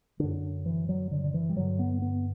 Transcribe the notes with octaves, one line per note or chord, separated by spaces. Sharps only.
F#2 D3 D4
E3
F#3
D3
D3
E3
G3
G2 D3 F#3
B3
B3